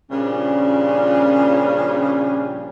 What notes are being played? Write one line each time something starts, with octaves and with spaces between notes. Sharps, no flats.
A#2 C#3 F3 G3 C#4 D4